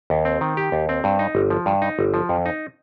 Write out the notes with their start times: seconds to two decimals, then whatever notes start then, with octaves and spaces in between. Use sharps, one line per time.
0.10 D#2
0.25 C4
0.41 D#3
0.57 G4
0.72 D#2
0.89 C4
1.04 G2
1.19 D#4
1.35 G1
1.50 F3
1.66 G2
1.82 D#4
1.99 G1
2.14 F3
2.29 F2
2.46 D#4